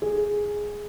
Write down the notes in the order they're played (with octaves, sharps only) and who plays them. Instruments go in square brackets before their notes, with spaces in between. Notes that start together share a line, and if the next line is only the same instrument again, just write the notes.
[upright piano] G#4